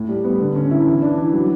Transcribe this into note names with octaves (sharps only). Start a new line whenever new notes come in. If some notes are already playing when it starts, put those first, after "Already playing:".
Already playing: A2
G3
B3
D3
C#4
E4
E3
D4
E3
F#3